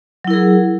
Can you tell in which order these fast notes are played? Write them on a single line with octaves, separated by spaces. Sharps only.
F#3 E4 A#4 G#4